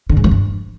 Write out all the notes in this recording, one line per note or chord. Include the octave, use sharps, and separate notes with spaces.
D3
G#2
F3
G2